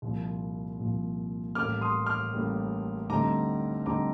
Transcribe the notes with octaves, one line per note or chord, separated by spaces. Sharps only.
C2 A#2 F3
C2 A#2 F3
A1 A2 G3 A#3 D6 F6
C6 D#6
D6 F6
A1 A2 G3 A#3
D2 D3 G3 C4 D#4 A#5 D6
D2 D3 G3 C4 D#4 A#5 D6